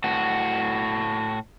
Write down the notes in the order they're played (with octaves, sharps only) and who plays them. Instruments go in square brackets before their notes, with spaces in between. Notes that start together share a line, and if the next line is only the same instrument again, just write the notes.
[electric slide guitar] A2 F#4